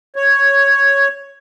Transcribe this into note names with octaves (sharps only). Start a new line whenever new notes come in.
C#5